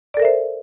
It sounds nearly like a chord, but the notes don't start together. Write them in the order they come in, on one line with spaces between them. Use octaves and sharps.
D5 A4 A#4 E5 C5